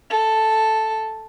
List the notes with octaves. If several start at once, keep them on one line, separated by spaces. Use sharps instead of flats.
A4